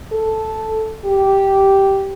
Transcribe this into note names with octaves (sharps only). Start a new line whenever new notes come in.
A4
G4